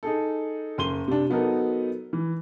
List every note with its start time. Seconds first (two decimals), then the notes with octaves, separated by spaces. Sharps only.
0.03 D#4 G#4 A4
0.78 F#1 C6 D#7 G7
1.08 C3 D4
1.30 F#3 B3 D#4 A4 A#4
2.13 E3